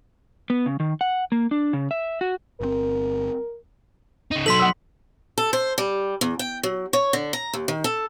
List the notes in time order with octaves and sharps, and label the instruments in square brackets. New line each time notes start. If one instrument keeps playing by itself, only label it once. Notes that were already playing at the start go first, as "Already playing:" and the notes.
[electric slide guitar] B3
C#3
D#3
F#5
A#3
D4
C#3
E5
F#4
[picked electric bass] G1 B2 C4 [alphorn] A#4
[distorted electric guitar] C#3 D#4
[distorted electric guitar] F#3 D#4 [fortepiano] A4 [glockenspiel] C6 B6 F#7
[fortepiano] F#5 D#6 E6
[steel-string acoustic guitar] A4
C5
G3
E2
G5
F#3
C#5
D3
A#5
D#2
D#3
A4